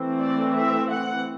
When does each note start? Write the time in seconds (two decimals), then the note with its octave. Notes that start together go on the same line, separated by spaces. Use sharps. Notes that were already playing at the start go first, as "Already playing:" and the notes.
Already playing: E3 A3 C4
0.19 D5
0.55 E5
0.90 F#5